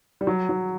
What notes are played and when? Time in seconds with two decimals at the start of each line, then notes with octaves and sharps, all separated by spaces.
0.21 G3
0.27 F#3
0.49 F#3